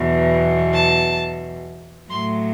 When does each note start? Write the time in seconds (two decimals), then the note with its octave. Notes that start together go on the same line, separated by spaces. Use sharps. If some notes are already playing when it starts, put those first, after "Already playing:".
Already playing: E2 B2 F#3
0.74 A5
2.09 A2 F#3 C6